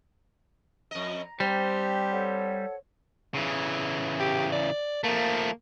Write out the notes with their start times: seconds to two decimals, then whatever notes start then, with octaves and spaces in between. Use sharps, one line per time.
0.91 F2 D#5 A#5
1.40 G3 C4 D4 G4 C5
2.10 A4 C#5 F#5
3.34 C#3 E3
4.20 G4
4.52 D5
5.04 F3 A3 A#3